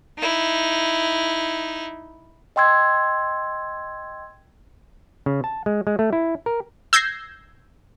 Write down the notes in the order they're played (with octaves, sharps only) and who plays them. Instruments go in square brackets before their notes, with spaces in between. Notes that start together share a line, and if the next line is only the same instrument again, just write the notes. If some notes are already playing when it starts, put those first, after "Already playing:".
[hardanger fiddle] D#4 E4
[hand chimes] D#5 G5 C6 E6 G#6
[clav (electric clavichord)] C#3
A5
G#3
G#3
A3
E4
A#4
[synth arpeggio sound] E6 G6 G#6 A#6 C7